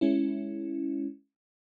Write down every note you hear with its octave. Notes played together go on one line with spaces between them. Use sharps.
G#3 C#4 E4